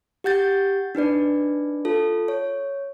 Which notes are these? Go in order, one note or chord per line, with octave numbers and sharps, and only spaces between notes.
G4 F#5 G6 A6
D4 D#4 B4 D5
F4 A4
C#5